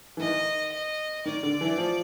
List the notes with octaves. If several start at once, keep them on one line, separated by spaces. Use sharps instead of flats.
E3
D#3 D#5
D#5
D#3 D5
D3
E3
F3